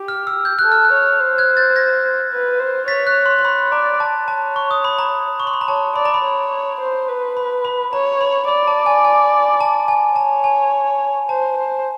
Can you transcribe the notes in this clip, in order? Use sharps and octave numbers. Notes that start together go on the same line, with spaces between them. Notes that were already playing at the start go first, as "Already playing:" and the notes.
Already playing: G4
F6
E6
G6
A4 F#6
F6
F#6
C#5
C5
F#6 G#6
G6 A6
G#6 A#6
B4
C5
C#5 A6 B6
F#6
C6
C6
C#5 B5
D5 A#5
A5
C#5 A5
C#6
D#6
B5
A#5
C#6
C6
B5
A#5
C#5 A5
D5 B5
A#5
B5
C#5
C5
B4
B5
B5
C#5 A#5
B5
D5 B5
A5
G#5
G#5
A5
G#5
C#5 A5
G#5
C5 A5
C5